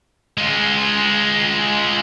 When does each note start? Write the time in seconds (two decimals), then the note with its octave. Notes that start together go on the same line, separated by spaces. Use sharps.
0.38 G#3 F4